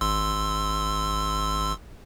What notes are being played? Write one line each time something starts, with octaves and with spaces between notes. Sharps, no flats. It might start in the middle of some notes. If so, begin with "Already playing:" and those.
G#1 C6 E6